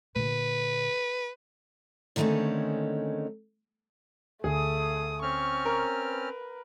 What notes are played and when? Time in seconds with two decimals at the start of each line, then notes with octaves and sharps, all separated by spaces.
0.16 A#2 D3 B4
2.16 D3 D#3 G#3 A3 C4 C#4
4.44 D2 D3 A3 G#4 D#6
5.22 C4 C#4 C#6 F6
5.65 A#4
6.01 B4